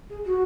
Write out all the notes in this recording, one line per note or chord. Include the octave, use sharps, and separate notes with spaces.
G#4
F#4